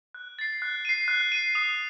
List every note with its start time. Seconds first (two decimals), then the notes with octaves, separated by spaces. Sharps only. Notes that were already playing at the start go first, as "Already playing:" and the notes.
0.14 F#6
0.39 A6 C7
0.62 F#6
0.85 C7 D#7
1.08 F#6
1.32 C7 D#7
1.55 D#6